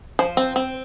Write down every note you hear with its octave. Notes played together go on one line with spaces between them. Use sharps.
F3 C5
C4
C4